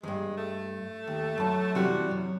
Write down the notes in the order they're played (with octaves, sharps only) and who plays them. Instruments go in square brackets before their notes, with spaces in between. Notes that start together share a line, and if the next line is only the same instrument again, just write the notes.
[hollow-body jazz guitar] E2 G2 [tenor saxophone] G#3
[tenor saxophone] A3
[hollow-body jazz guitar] D#2
F#2 A5
[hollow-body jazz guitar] C3 E3 G3 [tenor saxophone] F#4
[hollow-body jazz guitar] F#2